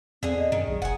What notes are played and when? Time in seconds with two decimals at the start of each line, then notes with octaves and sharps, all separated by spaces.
0.23 E2 D3 C4 G#4
0.38 D#5
0.52 F#2 D#3
0.68 B1 G#4
0.82 F1 F#5 G#5